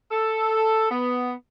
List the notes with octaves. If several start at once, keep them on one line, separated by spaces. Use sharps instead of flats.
A4
B3